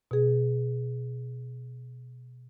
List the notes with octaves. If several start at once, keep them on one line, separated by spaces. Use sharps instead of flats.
B2 G#4